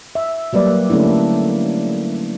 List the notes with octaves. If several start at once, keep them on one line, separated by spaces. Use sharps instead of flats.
E5
F#3 G3 A#3 B4 D5
D3 A3 A#3 C#4 D4 E4